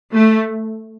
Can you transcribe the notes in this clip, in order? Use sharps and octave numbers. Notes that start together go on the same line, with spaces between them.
A3